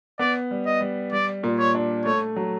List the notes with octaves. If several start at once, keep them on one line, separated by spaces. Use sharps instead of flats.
B3 D5
G3
D#5
G3
G3 D5
A#2
C#5
D4
A3 C#5
F#3